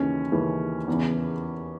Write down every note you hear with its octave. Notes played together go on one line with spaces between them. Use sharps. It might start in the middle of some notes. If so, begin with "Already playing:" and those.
Already playing: D#2 C#3 E3 C#4
D#2 C#3 E3
E2 C#3 E3